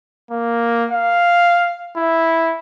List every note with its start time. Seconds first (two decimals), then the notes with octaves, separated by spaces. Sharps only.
0.31 A#3
0.91 F5
1.96 E4